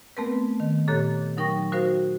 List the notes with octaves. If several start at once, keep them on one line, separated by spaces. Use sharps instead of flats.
A3 B3 C4 A#4 B4
D#3
A#2 G4 A4 C#5 A#5 F#6
F#3 D#4 A#4 G5 C#6 A#6
D#4 F#4 A#4 C5 F5